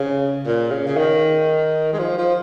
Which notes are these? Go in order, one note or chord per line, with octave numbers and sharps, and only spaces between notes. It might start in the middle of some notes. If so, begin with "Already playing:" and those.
Already playing: C#3
A#2
C#3
C#3
D#3
G#3
F3
F3